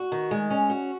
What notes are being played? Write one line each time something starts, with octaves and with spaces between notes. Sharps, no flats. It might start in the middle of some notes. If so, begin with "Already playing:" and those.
Already playing: F#4
D#3
G#3
C#4
F#4